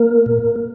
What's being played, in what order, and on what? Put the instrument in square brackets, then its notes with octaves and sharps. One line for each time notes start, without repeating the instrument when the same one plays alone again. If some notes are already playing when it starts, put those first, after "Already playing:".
Already playing: [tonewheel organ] A#3 A#4
A#2